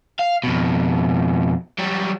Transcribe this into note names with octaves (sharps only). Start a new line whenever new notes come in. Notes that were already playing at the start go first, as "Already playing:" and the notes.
F5
F2 B2
F#3 G3